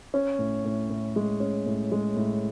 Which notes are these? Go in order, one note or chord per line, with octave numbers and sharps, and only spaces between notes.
C#4
A2
A2
A2
G#3
C#4
A2
G#3
A2